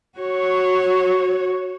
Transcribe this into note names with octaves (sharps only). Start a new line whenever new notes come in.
F#4 C#5